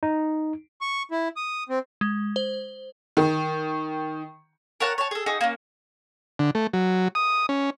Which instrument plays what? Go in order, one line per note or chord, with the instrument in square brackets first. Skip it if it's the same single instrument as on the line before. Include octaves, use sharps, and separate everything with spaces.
[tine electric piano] D#4
[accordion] C#6
E4
D#6
C4
[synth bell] G#3
C5
[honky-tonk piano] D#3
[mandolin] A#4 C#5 F#5 A5
C#5 A5
G#4 A4
D#4 F#4 G#4
A#3 C#4
[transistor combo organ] D3
A3
F#3
D#6
C#4